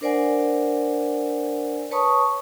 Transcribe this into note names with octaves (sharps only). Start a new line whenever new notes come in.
D4 A#4 C5 D5 F#5 G#5
B4 C#5 A5 B5 C#6 D#6